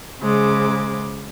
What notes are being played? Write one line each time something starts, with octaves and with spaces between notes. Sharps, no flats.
C#3 G#3 C5 D6